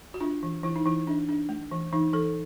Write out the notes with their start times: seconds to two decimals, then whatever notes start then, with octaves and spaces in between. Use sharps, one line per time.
0.14 F#4
0.20 D4 F4
0.43 E3
0.63 E3 E4
0.76 D#4
0.85 E3 E4
1.07 D4
1.29 D4
1.49 A3
1.71 E3
1.92 E3 D#4
2.13 E3 A4